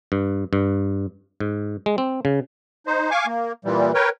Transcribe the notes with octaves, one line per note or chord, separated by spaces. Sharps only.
G2
G2
G#2
G#3
C4
C#3
D#4 C5
F5 G#5 C#6 D6
A#3
A#2 E3 G3
A#4 B4 C#5 G5